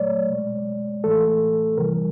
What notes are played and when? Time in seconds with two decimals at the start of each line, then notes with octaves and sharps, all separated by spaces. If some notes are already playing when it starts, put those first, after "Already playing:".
Already playing: A#2 F#3 A3 C#5 D5
0.29 B2 G#3
1.04 A2 E3 A3 A4
1.77 C3 E3 G3 A#4